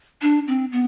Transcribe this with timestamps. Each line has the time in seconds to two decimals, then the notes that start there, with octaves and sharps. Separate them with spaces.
0.22 D4
0.48 C4
0.72 B3